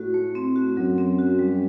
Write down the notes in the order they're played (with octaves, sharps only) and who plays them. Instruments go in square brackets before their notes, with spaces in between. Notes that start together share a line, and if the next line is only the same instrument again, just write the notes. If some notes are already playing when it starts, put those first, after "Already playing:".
Already playing: [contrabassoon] A2 [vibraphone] F#4
[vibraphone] A3
C4
F#4
[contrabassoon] F#2 [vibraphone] F#3
[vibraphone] C4
F#4
G3